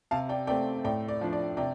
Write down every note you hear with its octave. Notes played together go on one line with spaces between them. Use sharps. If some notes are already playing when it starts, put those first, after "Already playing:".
C3 F5 A5
D5 G5
A3 C4 D5 G5
A2 D5 G5
D5
F3 D4
D5
C3 D5 G5